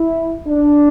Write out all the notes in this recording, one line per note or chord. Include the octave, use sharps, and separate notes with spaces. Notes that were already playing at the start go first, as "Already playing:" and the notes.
Already playing: E4
D4